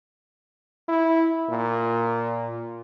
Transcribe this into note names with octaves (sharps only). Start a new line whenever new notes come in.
E4
A#2